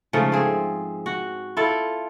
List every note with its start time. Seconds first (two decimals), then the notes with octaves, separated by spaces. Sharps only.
0.13 G#2 C#3 F3 A3
0.32 C4 G#4
1.06 F#4
1.57 E4 F4 A4